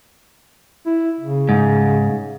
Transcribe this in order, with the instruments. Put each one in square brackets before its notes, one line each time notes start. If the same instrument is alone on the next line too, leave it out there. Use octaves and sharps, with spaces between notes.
[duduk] E4
C#3
[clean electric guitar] G#2